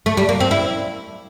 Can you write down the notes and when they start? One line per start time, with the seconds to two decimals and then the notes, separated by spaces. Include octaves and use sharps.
0.06 A3
0.17 G3
0.29 A#3
0.40 C4
0.51 E4